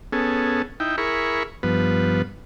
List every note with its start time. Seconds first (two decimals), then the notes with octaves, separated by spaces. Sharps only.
0.12 B3 C#4 G#4 A4
0.80 D#4 E4 G5
0.98 E4 G#4 A#4 B5 C#6
1.63 G2 F3 B3 B4